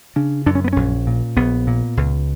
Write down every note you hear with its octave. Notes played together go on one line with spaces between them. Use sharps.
C#3 D4
F#2 D4
C#4
B3
A#1 C#4
A#2
A#1 B3
A#2
C#2